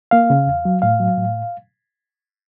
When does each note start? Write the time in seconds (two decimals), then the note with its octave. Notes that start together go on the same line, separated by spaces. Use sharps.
0.11 A#3 F5
0.30 C#3
0.47 E2
0.65 F#3
0.82 A2 F5
1.00 F#3
1.17 A2